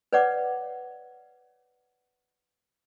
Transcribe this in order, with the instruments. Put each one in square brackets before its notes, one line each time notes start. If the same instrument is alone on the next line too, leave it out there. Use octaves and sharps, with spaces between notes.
[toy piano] B4 C#5 D5 F#5 D6